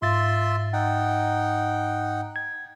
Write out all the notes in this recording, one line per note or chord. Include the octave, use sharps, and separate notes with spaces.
G#2 F4 E5 C6 A6
D#4 F#5 G5
G#6